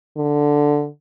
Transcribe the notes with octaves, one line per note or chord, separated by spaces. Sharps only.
D3